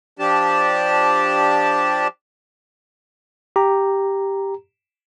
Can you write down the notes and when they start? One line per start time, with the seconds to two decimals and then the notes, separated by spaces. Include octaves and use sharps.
0.19 F3 D4 G4 A5
3.56 G4 A#5